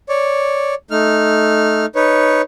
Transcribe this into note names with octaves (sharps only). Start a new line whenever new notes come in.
C#5 D5
A3 D#4 F6
D#4 B4 C#5